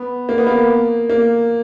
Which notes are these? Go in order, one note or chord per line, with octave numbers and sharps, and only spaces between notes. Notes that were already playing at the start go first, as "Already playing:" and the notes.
Already playing: B3
A#3
B3
A#3
A#3